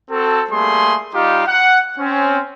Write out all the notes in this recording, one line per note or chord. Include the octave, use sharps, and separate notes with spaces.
C4 F#4 A4
G3 A3 A#3 G#4 C6
G3 D#4 F4 G4 F5
F#5
C4 C#4